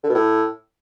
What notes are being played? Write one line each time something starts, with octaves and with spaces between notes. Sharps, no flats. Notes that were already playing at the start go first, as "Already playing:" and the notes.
D3
B2
A2